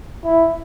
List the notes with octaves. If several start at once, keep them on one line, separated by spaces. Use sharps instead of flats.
E4